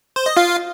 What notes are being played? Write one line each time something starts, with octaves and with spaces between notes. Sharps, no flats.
C5
D#5
F4 F5